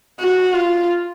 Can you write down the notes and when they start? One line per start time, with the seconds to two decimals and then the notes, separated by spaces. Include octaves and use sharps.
0.20 F#4
0.53 F4